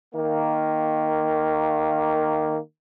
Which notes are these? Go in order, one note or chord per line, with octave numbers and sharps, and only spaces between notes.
D#3 A#3